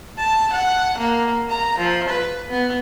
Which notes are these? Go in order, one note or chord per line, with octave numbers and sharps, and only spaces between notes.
A5
F#5
A#3
A#5
F3
B4
B3